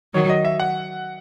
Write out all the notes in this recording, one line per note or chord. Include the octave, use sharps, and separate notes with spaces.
D#3 F#3 C#5
D#5
E5
F#5